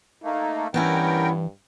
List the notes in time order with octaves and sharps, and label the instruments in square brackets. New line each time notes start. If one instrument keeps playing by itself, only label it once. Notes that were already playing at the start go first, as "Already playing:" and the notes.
[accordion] A3 A#3 [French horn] D#4
[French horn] G2 [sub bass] E3 [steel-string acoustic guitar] B3 C#4 E4 [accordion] A#4 G5